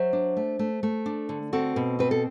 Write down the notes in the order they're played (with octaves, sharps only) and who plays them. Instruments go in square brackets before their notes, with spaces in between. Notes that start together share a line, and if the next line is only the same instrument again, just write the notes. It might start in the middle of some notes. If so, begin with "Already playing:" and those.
Already playing: [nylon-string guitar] F#3 C5 E5
D4
A3
A3
A3
D4
D3
C4 F#4 A4
B2
C4 B4
A4